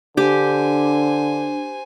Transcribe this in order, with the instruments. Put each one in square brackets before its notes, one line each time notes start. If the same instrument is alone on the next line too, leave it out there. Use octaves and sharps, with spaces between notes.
[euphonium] D3 [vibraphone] D4 [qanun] G4 [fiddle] C5 G#5